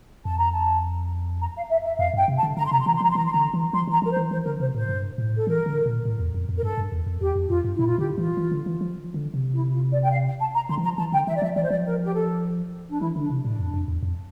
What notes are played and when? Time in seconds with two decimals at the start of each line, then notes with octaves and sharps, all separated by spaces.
0.25 F2 A5
0.38 A#5
0.50 A5
1.41 A#5
1.55 F5
1.70 E5
1.85 E5
1.99 F2 F5
2.14 G2 G5
2.28 C3
2.38 A5
2.43 D3
2.57 D3 A#5
2.65 C6
2.71 C3 A#5
2.80 C6
2.86 E3 A#5
2.95 C6
3.00 F3 A#5
3.10 C6
3.15 E3 A#5
3.25 C6
3.33 D3 A#5
3.54 E3
3.73 F3 C6
3.87 E3 A#5
4.02 F3 A#4
4.11 C5
4.17 E3
4.31 E3 C5
4.46 D3 A#4
4.60 C3 C5
4.75 A2 C5
4.89 G2
5.18 A2
5.37 A4
5.47 E3 A#4
5.66 D3
5.86 A#2
6.05 A2
6.19 E2
6.34 F2
6.49 F2
6.57 A#4
6.63 G2 A4
6.78 G2
6.92 E2
7.06 F2
7.21 E2 G4
7.35 F2
7.50 F2 F4
7.64 G2
7.75 A#2 E4
7.86 F4
7.98 D3 G4
8.18 E3 F4
8.37 E3
8.52 D3
8.66 E3
8.81 F3
9.14 D3
9.34 C3
9.54 E4
9.72 F4
9.92 D5
10.04 G5
10.12 F5
10.40 A5
10.55 A#5
10.69 D3 C6
10.78 E3
10.84 F3 A#5
10.98 E3 A5
11.12 D3 G5
11.27 E3 E5
11.35 D5
11.42 F3 E5
11.55 E3 D5
11.63 C5
11.70 F3 D5
11.86 A#4
12.02 G4
12.14 A4
12.89 D4
13.01 E3 E4
13.16 D3 D4
13.30 C3
13.40 A2 D4
13.59 F2
13.74 F2
13.88 E2
14.03 F2